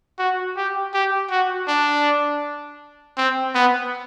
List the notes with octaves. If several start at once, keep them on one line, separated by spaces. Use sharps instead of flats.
F#4
G4
G4
F#4
D4
C4
B3